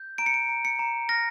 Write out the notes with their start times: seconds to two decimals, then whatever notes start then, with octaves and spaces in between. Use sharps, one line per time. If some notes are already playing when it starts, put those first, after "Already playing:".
Already playing: G6
0.18 A#5 D7
0.26 C#7
0.34 D7
0.49 A#5
0.65 C#7
0.79 A#5
1.09 F6 A#6